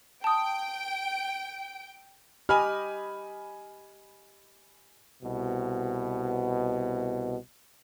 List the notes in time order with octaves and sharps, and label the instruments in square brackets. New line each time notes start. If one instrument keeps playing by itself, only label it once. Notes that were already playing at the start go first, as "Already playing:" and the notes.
[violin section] G5 D7 [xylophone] A5 D#6
[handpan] G4 D#5 [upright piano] G#5 B5 F6
[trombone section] C2 B2